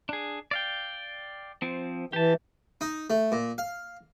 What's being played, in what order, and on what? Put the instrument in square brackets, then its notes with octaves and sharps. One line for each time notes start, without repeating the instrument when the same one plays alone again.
[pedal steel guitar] D4 G#4
D5 F5 G5
F3 C4
[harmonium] E3 [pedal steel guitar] G4 A5
[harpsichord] D#4
A3
A#2
F5